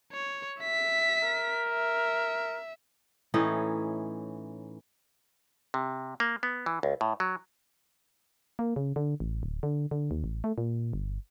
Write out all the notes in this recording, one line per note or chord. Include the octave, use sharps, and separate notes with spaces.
C#5
E5 B6
A#4
E5
A2 E3 C#4 D#4
C3
A#3
B3
E3
C#2
A2
F#3
A#3
C#3
D3
A1
D1
D3
D3
D#2
A1
A3
A#2
G1